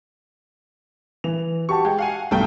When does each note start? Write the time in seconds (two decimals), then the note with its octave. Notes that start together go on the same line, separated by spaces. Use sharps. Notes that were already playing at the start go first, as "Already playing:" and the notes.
1.24 E3 F7
1.69 F#4 G4 A5 C#6
1.85 G#3 G5
1.99 F5 F#5 G#5
2.31 B1 G2 A3 G5